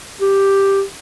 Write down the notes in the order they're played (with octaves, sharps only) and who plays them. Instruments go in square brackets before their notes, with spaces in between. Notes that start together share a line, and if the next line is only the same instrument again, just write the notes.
[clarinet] G4